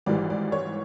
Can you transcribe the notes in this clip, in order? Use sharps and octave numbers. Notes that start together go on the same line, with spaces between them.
G#1 G#2 E3 G3 D5
D5
C#5